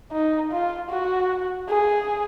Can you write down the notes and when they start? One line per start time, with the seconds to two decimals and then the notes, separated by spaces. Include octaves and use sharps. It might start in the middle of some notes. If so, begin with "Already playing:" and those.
0.12 D#4
0.51 F4
0.90 F#4
1.68 G#4